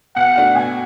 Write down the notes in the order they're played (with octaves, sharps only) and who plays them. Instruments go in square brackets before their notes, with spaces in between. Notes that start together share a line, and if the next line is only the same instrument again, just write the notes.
[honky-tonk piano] B2 [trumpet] F#5
[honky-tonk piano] A3 D4 F#4
[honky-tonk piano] B2 [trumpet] G#5